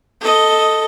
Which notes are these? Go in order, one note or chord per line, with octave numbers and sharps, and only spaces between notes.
A4 D#5